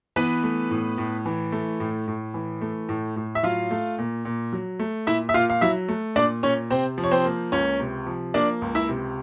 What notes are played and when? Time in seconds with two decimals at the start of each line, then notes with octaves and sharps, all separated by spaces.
0.16 E3 B3 B4
0.43 A3
0.71 A2
0.98 A2
1.26 E3
1.52 A3
1.80 A2
2.08 A2
2.34 E3
2.61 A3
2.89 A2
3.16 A2
3.35 E5
3.43 F#3 F4 F5
3.71 A3
3.98 A#2
4.25 A#2
4.53 F#3
4.79 A3
5.07 A#2 E4 E5
5.29 E5
5.34 A#2 F4 F5
5.50 F5
5.61 F#3 E4 E5
5.88 A3
6.16 A#2 D4 D5
6.43 A#2 C#4 C#5
6.70 C3 C4 C5
6.98 F3
7.04 C#5
7.11 C4 C5
7.25 A#3
7.52 C#2 C#4 C#5
7.80 C3
8.06 F3
8.34 A#3 D4 D5
8.62 C#2
8.75 E4 E5
8.89 C3